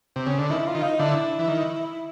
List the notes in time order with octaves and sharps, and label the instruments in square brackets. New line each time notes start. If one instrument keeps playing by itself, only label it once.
[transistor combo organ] C3
C#3
D3
[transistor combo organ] D#3 [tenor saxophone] E4
[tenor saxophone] F4
[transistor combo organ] D#3
[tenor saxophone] D#4
[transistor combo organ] D3 [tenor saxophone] E4
[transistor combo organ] E3
D#3